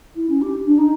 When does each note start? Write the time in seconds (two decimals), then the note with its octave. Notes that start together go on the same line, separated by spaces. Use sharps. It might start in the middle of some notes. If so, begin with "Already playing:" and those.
0.16 E4
0.29 C#4
0.42 G4
0.66 D4
0.78 D#4